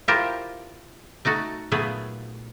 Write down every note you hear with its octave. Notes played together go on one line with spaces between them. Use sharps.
E4 F4 G4 A#4 C5
A3 D#4 F#4 A4
A#2 F#3 A3 B3 G#4 B4